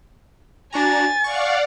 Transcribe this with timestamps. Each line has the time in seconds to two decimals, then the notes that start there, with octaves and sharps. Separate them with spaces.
0.72 D4 F#4 G#5 A#5 A6
1.24 D5 F5 F#5 C#6